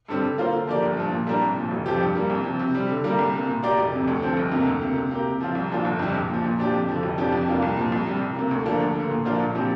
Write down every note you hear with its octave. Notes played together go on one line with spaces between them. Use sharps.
G2 D3 G3 C4
D3
A#3 F4 C5
D3
F3 A#3 G4 D5
G1
G2 F3
A#2
G3 A#3 D4 A#4
C2
A#2 F3
F1
F2 F3 C4 G4
G2
G3 A#3
C2
C3 F3
C3
G3 C4
D3
G3 A#3 G4 A#4
C2
C3 A#3
A#2
A#3 G4 A#4 D5
F1
F2 C3
D2
D3 F3 C4
G1
F2 C3 A#3
D2
C3 A#3
C3
A#3 G4
C3
F3 C4 F4
C2
A#2 F3 D4 F4
G1
F2 C3 G3
A#1
A#2 F3
A#2
F3 D4 G4
F2
D3 F3
F1
F2 F3 D4 G4
F2
C3 A#3 D4 F4
C2
A#2 F3
C2
C3 G3
C2
C3 A#3
D2
D3 F3 A#3 D4
D2
D3 A#3
A#2
F3 A#3 D4 F4
A#1
A#2 F3 C4 G4